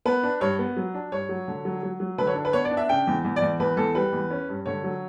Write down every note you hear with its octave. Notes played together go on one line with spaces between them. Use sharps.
B3 B4
D4
G2 C#5
B3
F#3
D4
G2 C#5
F#3
D3
F#3
F#3
F#3
D3 B4
C#5
D4
B4
B3 C#5
D5
D4
E5
C#3 G5
E2
E2
D5
E2
E2 B4
E2 A4
G3 B4
E2
C#4
G2
D3 C#5
F#3